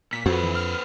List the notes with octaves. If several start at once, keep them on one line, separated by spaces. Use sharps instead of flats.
A#2 B6
F2 C4 F#4 B4
E3
F6